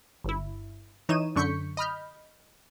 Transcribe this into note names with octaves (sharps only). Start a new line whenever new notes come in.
G1 E4
E3 D#4 C#5 D#7 E7
F#2 D3 C#6 G6 B6 C#7
D#5 B5 F6 G6